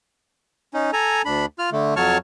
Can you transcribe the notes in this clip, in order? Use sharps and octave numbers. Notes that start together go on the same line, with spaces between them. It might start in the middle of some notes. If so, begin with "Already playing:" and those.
C#4 D#4
A4 G#5 A#5
D2 D4 B5
F4 F6
D3 A3
F2 F#3 C#5 A5 C#6 F6